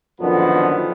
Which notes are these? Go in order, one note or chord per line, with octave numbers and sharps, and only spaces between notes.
F#2 A#2 D3 D#3 F3 B3